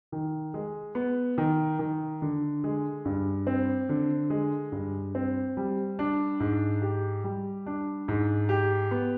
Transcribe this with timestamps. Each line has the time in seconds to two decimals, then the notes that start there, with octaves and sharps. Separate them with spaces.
0.12 D#3
0.54 G#3
0.95 B3
1.38 D#3
1.79 D#3
2.22 D3
2.64 G#3
3.05 G2
3.47 C4
3.89 D3
4.30 G#3
4.72 G2
5.15 C4
5.57 G3
5.99 D4
6.40 G#2
6.82 G4
7.24 G3
7.66 D4
8.08 G#2
8.49 G4
8.91 B3